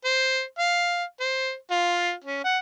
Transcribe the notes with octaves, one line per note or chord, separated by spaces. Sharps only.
C5
F5
C5
F4
C#4
F#5